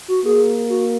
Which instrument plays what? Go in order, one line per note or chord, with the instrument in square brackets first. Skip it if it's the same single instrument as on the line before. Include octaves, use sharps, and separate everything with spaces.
[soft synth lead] F#4
[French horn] A#3 [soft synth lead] G#4
[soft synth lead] F#4